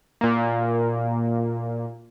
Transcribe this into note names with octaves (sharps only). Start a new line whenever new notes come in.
A#2 A#3